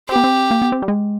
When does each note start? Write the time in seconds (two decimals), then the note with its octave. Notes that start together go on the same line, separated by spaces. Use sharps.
0.09 C4 G4
0.16 B3
0.24 C4
0.51 A#3
0.62 B3
0.72 C4
0.82 G3
0.88 G#3